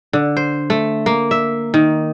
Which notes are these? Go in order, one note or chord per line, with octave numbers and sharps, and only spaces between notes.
D3
C5
A3
A#3
E5
D#3